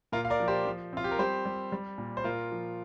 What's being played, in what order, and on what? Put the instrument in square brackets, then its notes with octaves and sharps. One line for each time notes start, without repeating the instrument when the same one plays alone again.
[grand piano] A#2 F4 A#4
F5
A#4 D5
F3
G4 C5
F3
C4 F4
G4
A#4
G3 G4 C5
G3
G3
A#2
C5
A#2 F4 A#4
F3